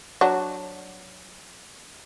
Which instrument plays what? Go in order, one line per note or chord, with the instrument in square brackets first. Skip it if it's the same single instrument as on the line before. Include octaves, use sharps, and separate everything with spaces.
[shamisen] F#3 D4